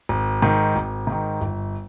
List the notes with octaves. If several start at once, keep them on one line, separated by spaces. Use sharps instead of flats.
G#1
G#2 D#3
G#1
G#2 D#3
G1